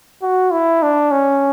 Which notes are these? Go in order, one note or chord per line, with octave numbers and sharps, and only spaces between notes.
F#4
E4
D4
C#4